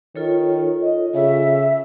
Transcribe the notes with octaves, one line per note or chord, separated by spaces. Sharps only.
D#3 F4 A4 C#5
D#5
C#3 E5